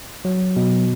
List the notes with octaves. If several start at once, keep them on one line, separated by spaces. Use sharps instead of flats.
F#3
B2